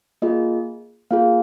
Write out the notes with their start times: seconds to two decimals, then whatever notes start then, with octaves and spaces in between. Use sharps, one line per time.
0.22 A#3 F4 G#4 D#5
1.10 A#3 F4 G#4 F5